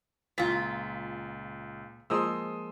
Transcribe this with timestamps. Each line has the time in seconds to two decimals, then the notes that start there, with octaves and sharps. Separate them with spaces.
0.38 C#2 A#2 F4 B6
2.10 F3 G#3 A#3 C6 D#6 E6